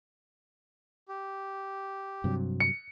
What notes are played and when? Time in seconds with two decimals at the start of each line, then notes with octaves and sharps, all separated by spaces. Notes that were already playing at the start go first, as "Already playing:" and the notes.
1.09 G4
2.24 G2 C3 F#3
2.60 C#7